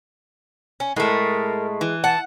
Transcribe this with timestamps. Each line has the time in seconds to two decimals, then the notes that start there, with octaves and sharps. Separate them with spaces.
0.80 C#4
0.96 A2 G#3 A3 A#4
1.81 E3
2.04 F#5 A5